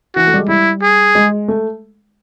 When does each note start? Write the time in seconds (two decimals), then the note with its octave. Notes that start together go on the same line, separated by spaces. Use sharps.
0.15 E3 F#4
0.27 A3
0.34 G3
0.38 G#3
0.48 G3 E4
0.82 G#4
1.15 G#3
1.48 A3